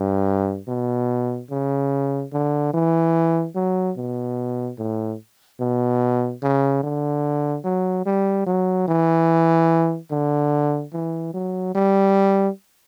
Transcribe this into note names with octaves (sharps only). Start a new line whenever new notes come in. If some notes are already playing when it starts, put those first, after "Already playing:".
Already playing: G2
B2
C#3
D3
E3
F#3
B2
A2
B2
C#3
D3
F#3
G3
F#3
E3
D3
E3
F#3
G3